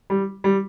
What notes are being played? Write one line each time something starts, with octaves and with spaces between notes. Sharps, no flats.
G3
G3